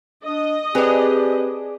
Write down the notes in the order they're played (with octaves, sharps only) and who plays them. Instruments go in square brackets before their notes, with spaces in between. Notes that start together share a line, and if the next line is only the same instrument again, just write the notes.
[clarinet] D4 [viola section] D#5
[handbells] C4 B4 [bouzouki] D4 G#4 [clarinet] G4